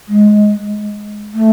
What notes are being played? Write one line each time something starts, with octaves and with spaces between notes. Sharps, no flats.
G#3
A3